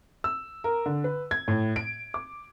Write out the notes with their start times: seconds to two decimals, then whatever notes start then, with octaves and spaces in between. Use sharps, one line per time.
0.24 E6
0.64 A#4
0.86 D3
1.04 B4
1.31 G#6
1.48 A2
1.76 D7
2.14 D6